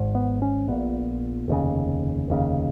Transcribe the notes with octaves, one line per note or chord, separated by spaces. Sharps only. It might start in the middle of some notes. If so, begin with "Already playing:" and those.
Already playing: G#1 G#2
B3
C#4
A#1 A#2 B3
F1 D#2 C#3
F1 D#2 C#3